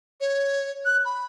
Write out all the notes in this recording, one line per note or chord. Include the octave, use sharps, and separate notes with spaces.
C#5
F#6
B5